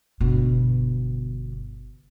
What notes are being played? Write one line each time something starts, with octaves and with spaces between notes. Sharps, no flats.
G1 B2